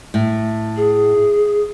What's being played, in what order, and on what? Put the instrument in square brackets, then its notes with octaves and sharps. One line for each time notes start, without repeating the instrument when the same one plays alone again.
[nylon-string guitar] A2
[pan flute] G#4